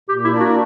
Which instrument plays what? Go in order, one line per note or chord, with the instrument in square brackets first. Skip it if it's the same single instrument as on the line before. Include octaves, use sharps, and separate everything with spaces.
[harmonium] A#2 [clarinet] G4
[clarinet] E4
[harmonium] A#3 D4 A#4 D5
[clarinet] F#4